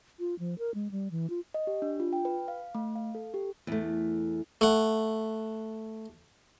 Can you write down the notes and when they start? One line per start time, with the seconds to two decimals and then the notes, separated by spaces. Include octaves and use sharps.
0.19 F4
0.39 F3
0.59 A#4
0.75 G#3
0.91 G3
1.11 E3
1.30 F4
1.54 D#5
1.67 G4
1.82 D4
2.00 F4
2.13 G5
2.25 B4
2.48 F5
2.75 A3
2.95 F5
3.15 A4
3.34 G4
3.67 E2 A3
4.61 A3 F#5